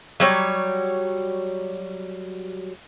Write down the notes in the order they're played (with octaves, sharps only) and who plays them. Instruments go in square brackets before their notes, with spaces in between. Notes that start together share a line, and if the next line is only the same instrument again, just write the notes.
[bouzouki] F#3 G3 C#5